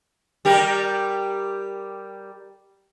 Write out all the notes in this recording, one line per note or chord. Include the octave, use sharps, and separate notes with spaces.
G3 G4 A#4